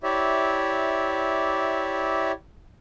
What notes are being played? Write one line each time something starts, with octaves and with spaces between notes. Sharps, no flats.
E4 G4 C#5 D5 E5